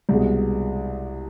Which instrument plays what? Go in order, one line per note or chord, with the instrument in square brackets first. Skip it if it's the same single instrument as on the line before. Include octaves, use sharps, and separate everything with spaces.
[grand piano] C2 B2 G#3